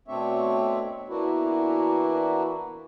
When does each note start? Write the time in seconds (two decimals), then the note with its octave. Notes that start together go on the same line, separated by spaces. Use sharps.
0.08 B2 A3 C4 D4 C#5 E5
1.09 E3 A#3 B3 D4 E4 F#4